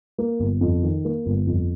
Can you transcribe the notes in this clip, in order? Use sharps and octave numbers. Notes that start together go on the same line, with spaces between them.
A#3
G1
F2
D#3
A#3
G1
F2